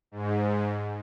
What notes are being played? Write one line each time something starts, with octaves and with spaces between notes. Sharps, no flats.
G#2